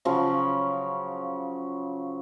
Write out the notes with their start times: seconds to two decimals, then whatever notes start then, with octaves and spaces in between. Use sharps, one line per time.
0.05 C#3 F3 F#3 C#4